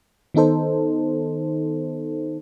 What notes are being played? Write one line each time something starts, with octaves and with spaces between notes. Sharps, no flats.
D#3 B3 D#4 A4 C5